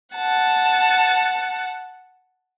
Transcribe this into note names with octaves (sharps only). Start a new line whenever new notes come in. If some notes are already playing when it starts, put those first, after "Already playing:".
F#5 A5